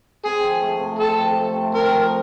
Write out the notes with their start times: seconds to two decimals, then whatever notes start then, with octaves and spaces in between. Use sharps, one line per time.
0.25 C4 G#4
0.44 F3
0.62 A3
0.80 C3
0.99 C4 A4
1.19 F3
1.37 A3
1.55 C3
1.74 C4 A#4
1.93 F3